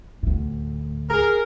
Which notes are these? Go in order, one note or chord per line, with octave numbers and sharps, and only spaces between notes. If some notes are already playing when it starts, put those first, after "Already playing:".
D2 A2
G#4 A#4